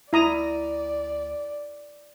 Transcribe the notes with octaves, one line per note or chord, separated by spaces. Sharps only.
D2 E4 D5 A#5 D#6